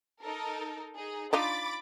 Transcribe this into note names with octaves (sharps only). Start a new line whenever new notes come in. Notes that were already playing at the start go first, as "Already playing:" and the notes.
D#4 A4 A#4
D#4 G#4
D4 D#4 F4 B5 D6 A6